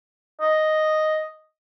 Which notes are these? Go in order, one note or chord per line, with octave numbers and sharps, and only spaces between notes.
D#5